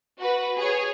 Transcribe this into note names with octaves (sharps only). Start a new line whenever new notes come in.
F#4 B4
G#4 C#5